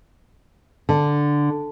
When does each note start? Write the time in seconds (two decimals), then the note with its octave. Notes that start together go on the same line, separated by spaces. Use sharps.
0.89 D3